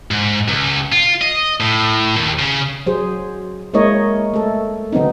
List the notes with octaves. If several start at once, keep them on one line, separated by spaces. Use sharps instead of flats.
G#2
C#2
F4
D#5
A2
D#2
C#3
F#3 G#4 C5
G#3 A#3 E4 A#4 C#5 D#5
A3 A4
D3 F#3 B3 C4 D#4